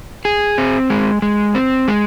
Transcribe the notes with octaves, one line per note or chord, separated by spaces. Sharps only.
G#4
C4
G#3
G#3
C4
G#3